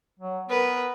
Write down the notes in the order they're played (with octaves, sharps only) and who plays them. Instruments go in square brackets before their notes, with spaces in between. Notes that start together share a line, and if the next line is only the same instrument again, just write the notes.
[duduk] F#3
[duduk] B3 [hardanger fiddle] A#4 B4